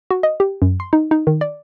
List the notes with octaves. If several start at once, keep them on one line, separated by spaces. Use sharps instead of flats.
F#4
D#5
G4
F#2
C6
D#4
D#4
D#3
D5